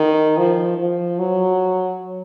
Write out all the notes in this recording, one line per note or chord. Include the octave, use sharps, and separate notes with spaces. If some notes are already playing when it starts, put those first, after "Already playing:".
Already playing: D#3
F3
F3
F#3